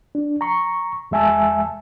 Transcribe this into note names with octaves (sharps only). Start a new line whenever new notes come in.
D4
A#5 C#6
E2 G#3 E5 G#5 A5 E6